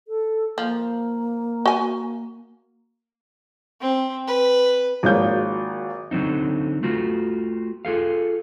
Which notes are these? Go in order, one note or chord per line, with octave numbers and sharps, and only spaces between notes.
A4
F3 A#3
F#4 G#5
C4
B4
G#1 F3 F#3 G#3 A#3 G6
D3 F#3 G3 C4 D#4
A3 F4 F#4
F4 G#4 A4 F5